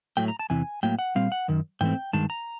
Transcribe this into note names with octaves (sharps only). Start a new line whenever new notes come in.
A2 F#3 A3 G5
A#5
A5
E2 C3 E3 G#5
A2 F#3 A#3 G5
F#5
A#2 G3 C4 F5
F#5
F#2 D#3
G#2 E3 A3 C4 G5
G2 D#3 G#3 A5
A#5